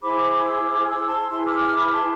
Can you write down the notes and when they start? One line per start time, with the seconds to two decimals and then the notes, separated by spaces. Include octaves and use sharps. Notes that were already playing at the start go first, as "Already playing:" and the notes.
0.01 E4 G#4 C5 B5 D6
0.22 B5 D6
0.43 C6 E6
0.65 D6 F6
0.86 C6 E6
1.07 A5 C6
1.29 E4 G#4 B4 C6 E6
1.44 D6 F6
1.60 D6 F6
1.77 B5 D6
1.92 A5 C6